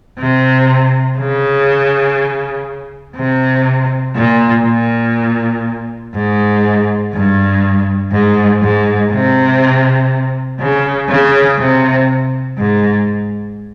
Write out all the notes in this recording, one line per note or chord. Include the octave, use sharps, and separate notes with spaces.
C3
C#3
C3
A#2
A#2
G#2
G2
G#2
G#2
C3
C#3
C#3
C3
G#2